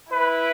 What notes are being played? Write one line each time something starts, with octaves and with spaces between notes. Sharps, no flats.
E4 B4